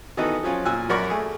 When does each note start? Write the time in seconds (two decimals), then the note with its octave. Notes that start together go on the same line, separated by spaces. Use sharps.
0.17 D#3 E3 B3 D#4 F#4 A4
0.43 F3 F#3 C#4 F4
0.65 A#2 G#5 E6 F#6
0.89 F#2 F#4 A#4 D5 B5 C#6
1.10 A3 G#4